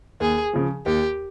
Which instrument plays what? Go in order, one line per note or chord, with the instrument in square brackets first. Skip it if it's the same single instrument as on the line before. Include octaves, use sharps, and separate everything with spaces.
[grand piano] D#2 [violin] G#4
[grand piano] C#3 F3
[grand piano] D#2 [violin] G4